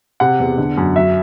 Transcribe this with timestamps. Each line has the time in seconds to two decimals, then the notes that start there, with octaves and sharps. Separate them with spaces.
0.20 C3 F#5
0.40 E2
0.58 D3
0.77 F#2
0.96 F#3 E5